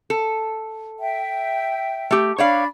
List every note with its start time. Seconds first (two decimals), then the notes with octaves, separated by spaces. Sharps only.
0.10 A4
1.00 E5 G5
2.11 A3 G4
2.38 D4 C#5 D5 F5 B5